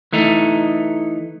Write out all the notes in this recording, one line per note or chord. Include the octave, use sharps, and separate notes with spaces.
E3 A3 D#4